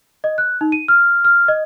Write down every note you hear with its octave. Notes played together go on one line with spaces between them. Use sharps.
D#5
F#6
D#4
D#7
F6
F6
D#5